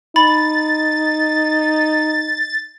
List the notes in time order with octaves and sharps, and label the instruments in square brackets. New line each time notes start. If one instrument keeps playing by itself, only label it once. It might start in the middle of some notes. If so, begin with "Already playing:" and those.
[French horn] D#4 [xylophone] B5 [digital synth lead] A6